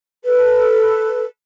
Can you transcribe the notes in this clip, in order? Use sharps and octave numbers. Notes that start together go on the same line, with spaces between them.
A4 B4